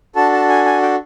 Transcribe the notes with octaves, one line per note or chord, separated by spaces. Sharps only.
D4 F#4 A4 A5
A5
G#5
G#5
G5